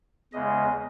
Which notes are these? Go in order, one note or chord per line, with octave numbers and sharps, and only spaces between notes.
E2 C#3 G#3 D#5